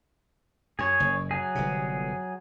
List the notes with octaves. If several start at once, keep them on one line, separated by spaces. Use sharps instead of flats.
F#2 G#4 C#5
F#1
F#3 G#4
G1 C3